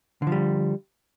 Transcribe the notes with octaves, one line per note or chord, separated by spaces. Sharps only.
D3 F3 G3